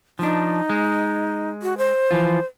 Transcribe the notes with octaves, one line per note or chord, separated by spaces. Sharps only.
F3 D4 D#4
G#3
F#4
C5
E3 F3 F4